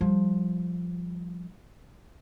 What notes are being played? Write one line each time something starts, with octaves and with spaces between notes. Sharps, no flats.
F3 G3